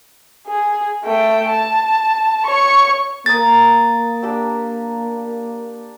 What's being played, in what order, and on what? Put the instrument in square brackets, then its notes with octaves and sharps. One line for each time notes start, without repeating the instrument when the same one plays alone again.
[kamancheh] G#4
A3 G5
A5
C#5 C#6
[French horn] A#3 [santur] A#4 A#5 D#6 [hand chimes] A6
[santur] D4 G4 E6